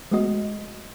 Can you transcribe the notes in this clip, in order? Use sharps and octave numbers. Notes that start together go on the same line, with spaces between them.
G#3 A3 B3 F#4 D#5